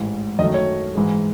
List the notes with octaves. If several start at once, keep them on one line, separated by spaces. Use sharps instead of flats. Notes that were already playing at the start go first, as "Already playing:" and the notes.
Already playing: A1 G#2 E3
F#2 D#3 F#3 A3 D#5
C#5
G#2 E3 G#3